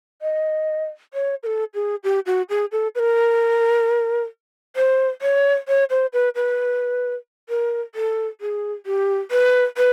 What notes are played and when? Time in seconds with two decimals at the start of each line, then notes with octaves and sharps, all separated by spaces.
0.22 D#5
1.14 C#5
1.43 A#4
1.46 A4
1.74 G#4
2.04 G4
2.26 F#4
2.50 G#4
2.72 A4
2.95 B4
2.99 A#4
4.76 C5
5.22 C#5
5.68 C#5
5.90 C5
6.13 B4
6.35 B4
7.49 A#4
7.95 A4
8.41 G#4
8.86 G4
9.31 B4
9.77 B4